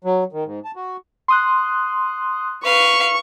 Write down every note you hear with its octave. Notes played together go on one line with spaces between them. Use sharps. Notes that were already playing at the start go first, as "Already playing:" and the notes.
F#3
D#3
G#2
A5
F#4
C6 D#6 F#6
B4 F5 C#6